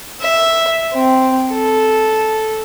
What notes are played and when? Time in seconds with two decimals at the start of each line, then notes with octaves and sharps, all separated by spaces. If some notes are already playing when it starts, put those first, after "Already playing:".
0.21 E5
0.93 C4
1.52 A4